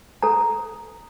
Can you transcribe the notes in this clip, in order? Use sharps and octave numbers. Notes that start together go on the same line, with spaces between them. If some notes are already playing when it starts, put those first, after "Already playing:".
A4 A#5